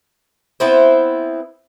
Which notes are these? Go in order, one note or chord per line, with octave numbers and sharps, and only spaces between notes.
B3 C4 E4 C5